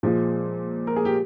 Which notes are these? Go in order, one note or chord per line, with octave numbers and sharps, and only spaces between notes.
A#2 F3 G#3
A#4
G#4
G4